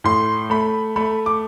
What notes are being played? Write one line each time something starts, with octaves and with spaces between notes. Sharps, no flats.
A2 C6
A3 B5
A3 B5
D6